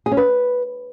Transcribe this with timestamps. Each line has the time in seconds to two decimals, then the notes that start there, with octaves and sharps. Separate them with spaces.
0.06 G#4
0.12 C#4
0.17 B4